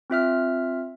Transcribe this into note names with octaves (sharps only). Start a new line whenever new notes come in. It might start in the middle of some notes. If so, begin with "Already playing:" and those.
C4 F4 E5 F6